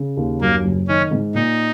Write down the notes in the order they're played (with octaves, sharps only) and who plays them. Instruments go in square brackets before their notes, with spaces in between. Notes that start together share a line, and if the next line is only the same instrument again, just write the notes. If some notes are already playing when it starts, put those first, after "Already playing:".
Already playing: [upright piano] C#3
D#2
[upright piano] F#2 [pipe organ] A#3
[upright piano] F#1
[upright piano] D#3 [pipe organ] C#4
[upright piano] G#2
[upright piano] A#2 [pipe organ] D#4